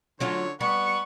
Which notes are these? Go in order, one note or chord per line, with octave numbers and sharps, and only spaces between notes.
D3 F#3 C#4 F4 C#5
G3 B3 F#5 B5 C#6